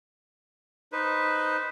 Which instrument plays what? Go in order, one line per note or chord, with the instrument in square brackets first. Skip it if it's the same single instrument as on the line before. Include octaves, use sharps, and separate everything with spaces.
[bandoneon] D#4 B4 C5